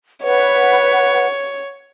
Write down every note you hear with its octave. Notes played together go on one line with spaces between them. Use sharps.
B4 C#5 F#5